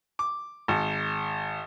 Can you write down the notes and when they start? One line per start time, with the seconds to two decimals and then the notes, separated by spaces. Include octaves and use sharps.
0.19 D6
0.68 G#1